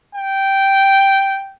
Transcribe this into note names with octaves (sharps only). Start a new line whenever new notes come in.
G5